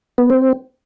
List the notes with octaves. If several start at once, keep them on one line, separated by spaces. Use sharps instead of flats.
B3
C4